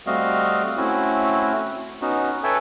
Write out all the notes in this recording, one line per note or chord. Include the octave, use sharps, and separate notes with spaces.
G3 A3 C4 F#4 D#5 F5
A3 C4 C#4 E4 F#4
B3 C#4 D#4 F#4
A4 B4 C#5 E5 G5 G#5